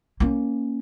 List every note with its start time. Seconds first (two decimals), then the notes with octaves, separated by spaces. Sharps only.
0.20 A#3 C#4